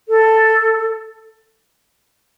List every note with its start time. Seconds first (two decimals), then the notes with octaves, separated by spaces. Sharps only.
0.09 A4